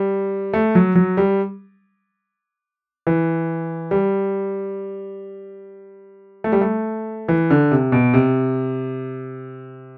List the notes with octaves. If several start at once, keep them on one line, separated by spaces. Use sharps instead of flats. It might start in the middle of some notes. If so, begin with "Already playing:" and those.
Already playing: G3
A3
F#3
F#3
G3
E3
G3
A3
G3
A3
E3
D3
C3
B2
C3